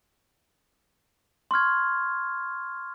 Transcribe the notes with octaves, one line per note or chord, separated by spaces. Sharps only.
C6 C#6 F6 G#6